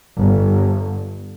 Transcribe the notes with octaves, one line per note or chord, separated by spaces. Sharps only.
G1